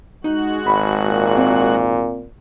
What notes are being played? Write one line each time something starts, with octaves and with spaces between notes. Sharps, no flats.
G#3 D#4 F#4 F#6
G#1 B5
A#2
C4